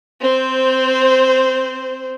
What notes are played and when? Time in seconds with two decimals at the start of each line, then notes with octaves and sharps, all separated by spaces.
0.20 C4 C5